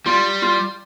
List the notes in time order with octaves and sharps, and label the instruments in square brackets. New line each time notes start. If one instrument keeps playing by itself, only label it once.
[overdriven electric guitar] G3 [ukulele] F4
[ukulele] F4